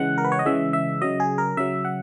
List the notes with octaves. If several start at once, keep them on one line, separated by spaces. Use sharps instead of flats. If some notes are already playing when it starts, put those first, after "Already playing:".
Already playing: C#3 E3 G#3 F#5
A#4
B4
C#5
D#5
C#3 E3 G#3 E5
E5
C#3 F#3 D#5
G#4
A#4
C#3 F#3 E5
F#5